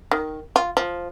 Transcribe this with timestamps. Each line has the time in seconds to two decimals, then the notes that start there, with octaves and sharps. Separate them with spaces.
0.11 D#3
0.56 F4
0.77 F3